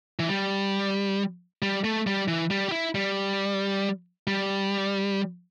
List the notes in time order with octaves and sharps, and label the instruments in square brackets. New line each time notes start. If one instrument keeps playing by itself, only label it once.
[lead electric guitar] E3
G3
G3
A3
G3
E3
G3
G4
E4
G3
G3